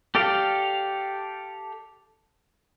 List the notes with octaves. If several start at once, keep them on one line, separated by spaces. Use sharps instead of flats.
G4 A4 D5 F5